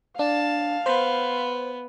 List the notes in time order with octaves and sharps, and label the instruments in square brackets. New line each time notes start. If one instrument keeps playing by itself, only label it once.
[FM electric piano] D4 [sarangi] F5 [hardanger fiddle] A5
[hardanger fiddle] B3 [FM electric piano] C5